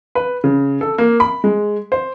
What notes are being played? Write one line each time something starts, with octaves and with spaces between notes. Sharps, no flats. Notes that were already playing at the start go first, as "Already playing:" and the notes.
B4
C#3
A4
A#3
B5
G#3
C5